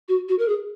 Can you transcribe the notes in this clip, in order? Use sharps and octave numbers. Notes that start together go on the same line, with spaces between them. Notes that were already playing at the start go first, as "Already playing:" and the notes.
F#4
F#4
A#4
G#4